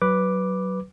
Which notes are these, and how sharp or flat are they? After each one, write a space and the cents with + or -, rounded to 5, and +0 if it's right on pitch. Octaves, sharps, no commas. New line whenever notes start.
F#3 +15 B4 +0 D6 +0